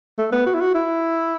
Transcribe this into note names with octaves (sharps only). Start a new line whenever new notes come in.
A3
B3
F#4
E4
F#4
E4